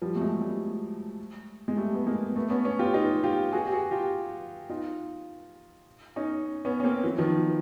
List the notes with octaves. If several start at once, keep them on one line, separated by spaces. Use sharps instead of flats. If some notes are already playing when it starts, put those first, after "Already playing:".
F3 G3
A3
F#3 G#3
G3 A3
G#3
G3 A3
B3
G#3 A#3
A3 B3
B3 C#4
B3 C#4
F4 G4
D#4 F4
F4 G4
F#4 G#4
G4
F#4 G#4
F4 G4
D#4 F4
C#4 D#4
B3 C#4
C#4
A#3 C4
E3 F#3
D#3 F3